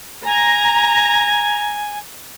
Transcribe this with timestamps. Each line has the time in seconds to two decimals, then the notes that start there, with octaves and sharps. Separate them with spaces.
0.25 G#5 A#5